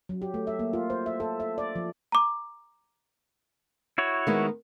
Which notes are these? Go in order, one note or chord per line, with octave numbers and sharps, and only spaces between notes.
F#3
G4
A3
E5
A#3
F4
C5
E5
A4
E5
D5
F3
A#5 D6
E4 F#4 C#5
D#3 G#3 B3